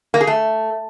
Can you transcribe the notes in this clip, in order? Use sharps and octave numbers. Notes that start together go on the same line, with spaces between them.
A#3
G#4
A3